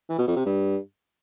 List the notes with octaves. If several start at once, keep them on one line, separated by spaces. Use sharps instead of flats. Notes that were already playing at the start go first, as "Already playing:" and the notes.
E3
B2
F2
C3
G2